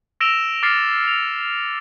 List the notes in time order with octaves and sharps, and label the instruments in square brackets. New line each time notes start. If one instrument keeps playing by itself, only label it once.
[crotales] E6 A#6 D7 E7 F7 G7
D6 F6 A6 C7 C#7
F7